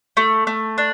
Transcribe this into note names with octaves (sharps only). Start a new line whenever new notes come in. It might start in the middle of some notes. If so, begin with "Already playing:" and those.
A3
A3
D4